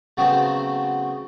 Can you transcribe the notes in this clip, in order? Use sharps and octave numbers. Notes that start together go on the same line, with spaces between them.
C#3 F#3 A3 B3 C4